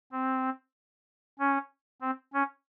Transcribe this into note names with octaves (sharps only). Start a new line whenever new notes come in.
C4
C#4
C4
C#4